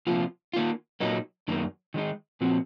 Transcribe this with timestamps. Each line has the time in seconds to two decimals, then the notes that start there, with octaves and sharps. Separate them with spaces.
0.07 C3 F3 A#3 F4
0.53 D#3 A#3 F4
1.00 A#2 F#3 A#3 D#4
1.48 F#2 D#3 A#3
1.94 D#3 G#3 D#4
2.41 A#2 F3 C4 F#4